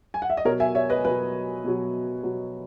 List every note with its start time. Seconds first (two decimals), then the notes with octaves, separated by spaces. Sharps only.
0.14 G#5
0.22 F#5
0.30 E5
0.37 D#5
0.45 B2 F#3 A#4 C#5
0.60 E5 G#5
0.75 C#5 E5
0.90 B4 D#5
1.05 B2 F#3 B4
1.64 B2 F#3
2.23 B2 F#3